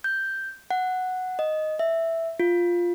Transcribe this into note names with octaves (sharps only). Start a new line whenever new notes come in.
G6
F#5
D#5
E5
F4